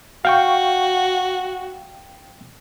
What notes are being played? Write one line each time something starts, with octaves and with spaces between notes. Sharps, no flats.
F#4 F5 G5 C#6